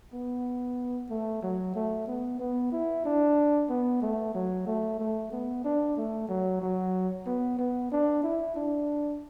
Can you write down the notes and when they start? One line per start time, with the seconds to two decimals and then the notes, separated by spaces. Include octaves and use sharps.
0.14 B3
1.10 A3
1.43 F#3
1.75 A3
2.07 B3
2.39 B3
2.72 E4
3.05 D4
3.70 B3
4.02 A3
4.34 F#3
4.67 A3
4.99 A3
5.32 B3
5.64 D4
5.97 A3
6.29 F#3
6.62 F#3
7.26 B3
7.59 B3
7.92 D4
8.23 E4
8.56 D4